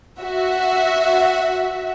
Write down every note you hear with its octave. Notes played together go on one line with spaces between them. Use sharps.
F#4 E5